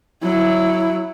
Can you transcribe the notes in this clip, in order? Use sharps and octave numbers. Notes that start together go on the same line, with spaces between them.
F#3 E4